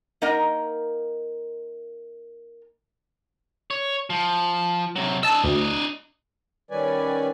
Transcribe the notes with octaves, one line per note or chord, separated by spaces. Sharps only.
A#3 D#4 A#4 D#5 F#5
C#5
F3
C3 F#3
D4 D#5 A5 E6
D2
D#3 G3 C#4 B4 D5 G#5